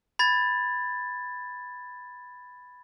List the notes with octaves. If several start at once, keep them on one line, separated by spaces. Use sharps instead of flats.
B5 G#6 A6